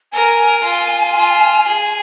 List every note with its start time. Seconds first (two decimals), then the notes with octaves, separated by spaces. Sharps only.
0.13 A#4 G#5
0.63 F4
1.15 F4
1.67 G#4